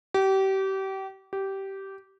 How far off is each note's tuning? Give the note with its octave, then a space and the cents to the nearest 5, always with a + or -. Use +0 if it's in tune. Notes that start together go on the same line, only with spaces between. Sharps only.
G4 -30
G4 -15